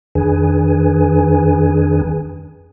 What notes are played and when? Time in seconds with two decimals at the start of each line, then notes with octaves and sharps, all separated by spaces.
0.15 F2 D#3 D4 G#4 B4 G#5